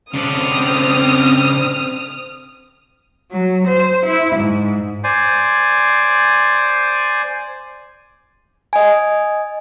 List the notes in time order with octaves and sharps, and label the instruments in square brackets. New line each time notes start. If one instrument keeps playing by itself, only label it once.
[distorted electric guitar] C#3 D4 [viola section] C4 [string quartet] D#6 F6
[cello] F#3
C5
E4
G#2
[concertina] C5 D5 G#5
[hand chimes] D#5 G#5